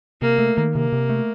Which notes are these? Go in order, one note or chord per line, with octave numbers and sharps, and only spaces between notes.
C3 A#3
A3
D#3
C3 A#3
C3
A3